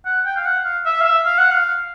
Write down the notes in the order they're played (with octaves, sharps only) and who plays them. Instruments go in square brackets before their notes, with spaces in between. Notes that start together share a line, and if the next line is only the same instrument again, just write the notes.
[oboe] F#5
G5
F5
F#5
F5
E5
F5
E5
F5
F#5
F5